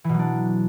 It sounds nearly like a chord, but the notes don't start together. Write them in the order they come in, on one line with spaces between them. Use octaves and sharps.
E3 B2 F#3 D4